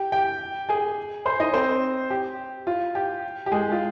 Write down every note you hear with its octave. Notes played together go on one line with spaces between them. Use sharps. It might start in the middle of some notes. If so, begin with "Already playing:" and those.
Already playing: G4 G5
G4 G5
G#4 G#5
C5 C6
D#4 D#5
C#5
C4 C5
G4
F4
G4
G4
G#3 G#4
F4